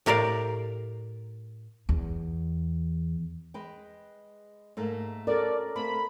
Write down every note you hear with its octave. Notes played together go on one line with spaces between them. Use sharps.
A2 G4 A#4 D5 F5
E2
G#3 B4 G5
G#2 A3 A#3
C#4 F#4 A4 A#4 D5
A3 A#3 C4 B5